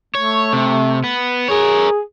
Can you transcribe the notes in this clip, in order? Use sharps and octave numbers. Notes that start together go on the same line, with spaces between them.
A3 C#5
C3
B3
G#4 A#4 C#5